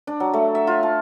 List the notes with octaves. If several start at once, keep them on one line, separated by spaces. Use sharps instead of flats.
D4
F#3
A3
E5
F4
A5